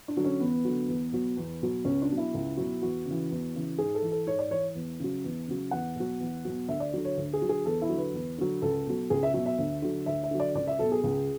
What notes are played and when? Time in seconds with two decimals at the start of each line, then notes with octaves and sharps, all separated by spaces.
0.08 D4
0.17 D3 F#3
0.25 C#4
0.40 E2 B3
0.65 D3 F#3
0.88 E2
1.12 B2 F#3
1.37 E2
1.62 B2 F#3
1.85 C#2 C#4
2.02 D4
2.09 B2 F#3
2.17 E4
2.34 C#2
2.57 B2 F#3
2.82 E2 F#4
3.06 C#3
3.11 E3
3.31 E2
3.55 C#3 E3
3.78 G#2 G#4
3.95 A4
4.02 E3
4.12 A4
4.27 G#2 C#5
4.39 D5
4.51 E3 C#5
4.75 E2
5.00 C#3 F#3
5.24 E2
5.48 C#3 F#3
5.71 E2 F#5
5.96 B2 F#3
6.20 E2
6.45 B2 F#3
6.68 D2 E5
6.80 D5
6.93 D3 F#3
7.05 C#5
7.17 D2
7.33 G#4
7.42 D3 F#3
7.49 G#4
7.65 E2 A4
7.82 E4
7.89 D3 F#3
7.97 B4
8.14 E2
8.38 D3 F#3
8.62 C#2 A4
8.86 B2 F#3
9.10 C#2 G#4
9.23 E5
9.34 B2 F#3 E5
9.46 E5
9.58 D2
9.82 D3 F#3
10.06 D2 E5
10.24 E5
10.31 D3 F#3
10.40 D5
10.55 C#2 D5
10.67 E5
10.79 B2 F#3 A4
10.92 G#4
11.04 C#2